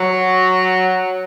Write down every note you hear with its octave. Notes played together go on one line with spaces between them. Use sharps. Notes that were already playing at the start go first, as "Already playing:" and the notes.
Already playing: F#3